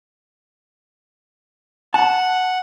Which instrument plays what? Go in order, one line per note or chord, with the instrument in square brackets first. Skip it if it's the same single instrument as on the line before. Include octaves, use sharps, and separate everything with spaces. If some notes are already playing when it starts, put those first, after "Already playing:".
[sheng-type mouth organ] F#5 [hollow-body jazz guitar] A5